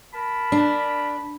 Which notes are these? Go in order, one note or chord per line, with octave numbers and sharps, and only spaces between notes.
A#4 A5 B5
D4